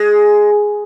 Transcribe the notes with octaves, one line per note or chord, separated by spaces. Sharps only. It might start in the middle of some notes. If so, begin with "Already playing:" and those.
Already playing: G#3